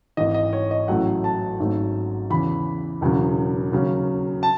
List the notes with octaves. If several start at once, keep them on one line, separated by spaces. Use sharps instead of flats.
G#1 G#2 E3 D#5
D#5
C#5
D#5
A1 A2 F#3 A3 F#5
A5
G#1 G#2 F#3 A3
E2 C#3 E3 B5
E1 E2 C#3 F#3
D#2 C#3 F#3 C#4
A5